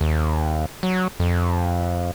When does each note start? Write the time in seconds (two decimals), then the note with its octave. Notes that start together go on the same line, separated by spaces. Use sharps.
0.01 D#2
0.83 F#3
1.20 F2